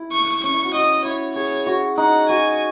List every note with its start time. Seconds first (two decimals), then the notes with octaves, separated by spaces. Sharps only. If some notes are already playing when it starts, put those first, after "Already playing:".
Already playing: E4
0.12 C#6
0.43 C#4 C#6
0.54 E4
0.64 F#4
0.74 F#4 D#5
1.05 E4 C#5
1.36 G#4 C#5
1.66 F#4
1.97 D#4 F#5
2.29 F#4 G#5